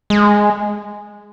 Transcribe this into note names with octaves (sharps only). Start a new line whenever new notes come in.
G#3